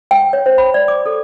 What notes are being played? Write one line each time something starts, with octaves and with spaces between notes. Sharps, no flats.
G5
C#5
C5
B5
D5
D6
A4